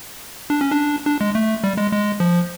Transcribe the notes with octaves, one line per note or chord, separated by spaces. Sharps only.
D4
C#4
D4
D4
G#3
A3
G3
G#3
G#3
F3